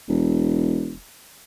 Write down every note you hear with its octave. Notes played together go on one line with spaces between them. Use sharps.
E1